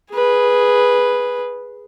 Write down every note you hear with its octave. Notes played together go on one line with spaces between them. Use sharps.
G#4 B4